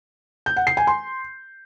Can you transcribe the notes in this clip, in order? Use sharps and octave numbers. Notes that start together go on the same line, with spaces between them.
G6
F#5
C7
G#5
C6